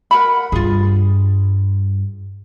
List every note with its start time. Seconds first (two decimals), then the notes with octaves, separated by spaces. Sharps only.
0.11 A#4 F#5 B5
0.52 G2 F4 G#4